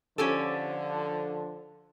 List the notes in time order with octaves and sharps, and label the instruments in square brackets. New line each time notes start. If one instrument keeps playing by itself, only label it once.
[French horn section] D3 F3 [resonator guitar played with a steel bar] C#4 G4 A4